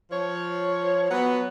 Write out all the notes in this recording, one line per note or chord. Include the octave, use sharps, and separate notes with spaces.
F3 C#5
F#3 B3